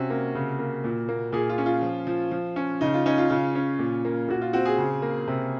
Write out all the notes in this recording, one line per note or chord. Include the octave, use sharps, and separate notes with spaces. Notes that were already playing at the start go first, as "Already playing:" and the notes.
Already playing: C3 C#4 F#4
A#3
C#3
A#3
A#2
A#3
A#2 G#4
F4
C#4
F4
F3
F3
F3
C#4
C#3 D#4
F4
C#4 D#4
F4
C#3 F4
C#4
A#2
A#3
A#2 F#4
F4
C4 F#4
G#4
C#3
A#3
C3